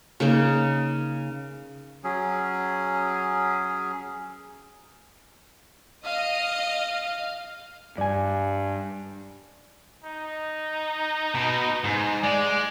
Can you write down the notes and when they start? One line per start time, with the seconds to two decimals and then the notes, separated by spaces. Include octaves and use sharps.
0.20 C#3 A#3 D#4
2.04 F#3 C#4 G#4
6.05 D#5 F5
7.98 G2 D5 G#5
10.04 D#4
11.35 B2
11.84 G#2
12.23 G#3 D5